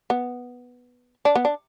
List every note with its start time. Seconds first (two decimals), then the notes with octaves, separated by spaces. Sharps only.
0.10 B3
1.25 D4
1.35 B3
1.45 D4